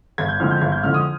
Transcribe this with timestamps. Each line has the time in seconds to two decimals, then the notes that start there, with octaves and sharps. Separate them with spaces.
0.18 G1 G#6
0.28 G6
0.40 F2 D3 G#3 F6
0.51 G6
0.61 G1 G#6
0.72 G6
0.83 F2 D3 G#3 F6
0.94 D#6